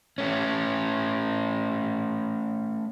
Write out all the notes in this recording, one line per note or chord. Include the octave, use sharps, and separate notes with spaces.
A3 C#4